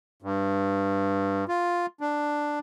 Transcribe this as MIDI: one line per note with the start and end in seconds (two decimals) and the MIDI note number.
0.22 1.45 43
1.49 1.86 65
2.01 2.59 62